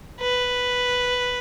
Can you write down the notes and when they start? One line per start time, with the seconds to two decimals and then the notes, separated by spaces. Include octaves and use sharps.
0.21 B4